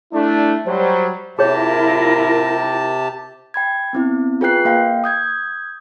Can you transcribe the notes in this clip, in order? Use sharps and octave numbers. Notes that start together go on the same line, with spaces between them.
A3 D4 E4
F#3 G3 C5
C3 E4 F4 G4 G#4 A#4 C#5 A5
G5 B5 G#6
B3 C4 E4
F4 G#4 B4 G5 F#6 C7
A#3 F5 G5
D#6 G6 G#6